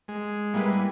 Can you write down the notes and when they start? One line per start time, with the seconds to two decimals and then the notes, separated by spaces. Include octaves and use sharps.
0.08 G#3
0.54 G3 A#3 B3 E4 B4